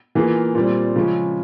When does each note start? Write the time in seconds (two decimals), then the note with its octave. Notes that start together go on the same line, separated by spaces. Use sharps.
0.15 E3 A#3 F4 G#4
0.55 A#2 G3 C4
0.96 C#3 F3 G#3 C#4